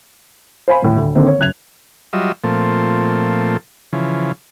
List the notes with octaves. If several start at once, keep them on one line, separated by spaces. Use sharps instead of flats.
C5 F5 G#5 B5
D#1 A2
D2
D3 D#3 A#3 C4
C#5
F#1 F#2 F#6 G#6 F7
F#3 G3 F4 D#5 E5
A#2 F3 A3 C4
C#3 E3 F3